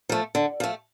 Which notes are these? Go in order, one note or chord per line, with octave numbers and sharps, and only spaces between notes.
F3 A3
D3
F3 A3